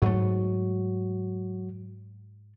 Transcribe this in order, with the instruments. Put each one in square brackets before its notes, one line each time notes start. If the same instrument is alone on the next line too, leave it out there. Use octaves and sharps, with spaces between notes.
[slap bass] G#2 A3 [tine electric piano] F#3 F#4